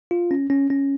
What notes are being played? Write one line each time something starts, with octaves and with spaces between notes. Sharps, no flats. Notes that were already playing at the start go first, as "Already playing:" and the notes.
F4
C#4
C#4
C#4